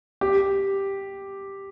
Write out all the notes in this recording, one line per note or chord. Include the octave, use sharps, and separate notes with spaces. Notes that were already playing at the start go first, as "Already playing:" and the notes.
G4